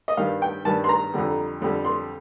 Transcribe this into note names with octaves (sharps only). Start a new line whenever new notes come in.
D#5
G2 D#3 G3 F5
G5
G2 D#3 G3 A5
C6
A#5
F2 D3 G3
F2 D3 G3
C6